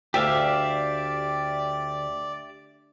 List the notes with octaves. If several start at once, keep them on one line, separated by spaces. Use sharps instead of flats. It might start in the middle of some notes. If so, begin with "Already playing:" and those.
D2 G4 D5 E5 F5